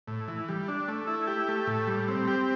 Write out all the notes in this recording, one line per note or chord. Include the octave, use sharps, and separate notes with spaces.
A2
E3
G3
D4
A3
E4
G4
A3
A2
G3
C4
G4